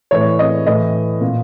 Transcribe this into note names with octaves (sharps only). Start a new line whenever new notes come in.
A2 E3 C#5
D#5
A2 E3 D#5
A#2